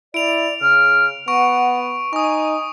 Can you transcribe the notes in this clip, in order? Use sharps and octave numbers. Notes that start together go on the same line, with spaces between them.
E4 D5 D7 F7
C#3 F6
B3 F#5 C#6 D7
D#4 G#5 C#6 D#6